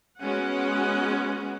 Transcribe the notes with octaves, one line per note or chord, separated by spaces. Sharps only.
G#3 B3 C#4 F#4 F#5